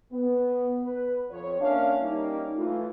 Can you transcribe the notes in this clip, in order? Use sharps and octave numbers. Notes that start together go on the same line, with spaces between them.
B3
B4
F2 C#5
A#3 C#4 D4 C#5 E5 F5
G3 A#3 C#4 D#4
E3 A3 F4